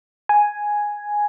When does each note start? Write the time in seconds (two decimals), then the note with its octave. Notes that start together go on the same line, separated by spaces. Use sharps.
0.29 G#5